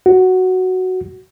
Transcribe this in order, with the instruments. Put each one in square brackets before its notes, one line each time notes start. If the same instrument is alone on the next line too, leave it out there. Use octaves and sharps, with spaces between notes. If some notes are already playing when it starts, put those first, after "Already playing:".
[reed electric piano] F#4